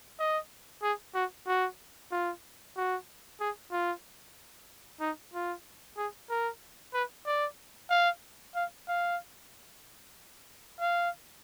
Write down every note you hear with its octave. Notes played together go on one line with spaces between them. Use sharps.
D#5
G#4
F#4
F#4
F4
F#4
G#4
F4
D#4
F4
G#4
A#4
B4
D5
F5
F5
F5
F5